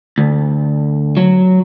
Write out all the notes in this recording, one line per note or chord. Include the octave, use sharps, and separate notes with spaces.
D2
F#3